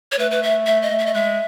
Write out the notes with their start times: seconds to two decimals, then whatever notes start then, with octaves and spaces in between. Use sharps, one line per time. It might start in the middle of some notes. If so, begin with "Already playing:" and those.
0.12 C#5
0.19 A3 B4
0.31 B4
0.43 E5
0.66 A3 E5
0.82 D#5
0.91 A3
0.99 E5
1.06 D#5
1.14 G#3 E5